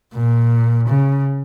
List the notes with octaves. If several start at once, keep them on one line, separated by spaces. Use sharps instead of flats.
A#2
C#3